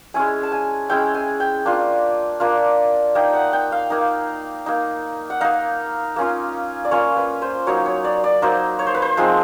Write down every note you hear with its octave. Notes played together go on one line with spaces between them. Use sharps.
G#3 C#4 E4 G#5
A5
G#5
G#3 C#4 E4 G5
G#5
G5
A#3 D4 F4
A#3 D4 F4
A#3 D#4 G5
F#5
G5
F5
A#3 D#4
A#3 D#4
F#5
A#3 D#4 F5
A#3 C#4 F4
D5
A#3 C#4 F4 C#5
B4
C5
F#3 A#3 D#4 C#5
C#5
D5
D5
F#3 A#3 D#4 C5
C#5
C5
B4
C5
F3 G#3 C4 D#4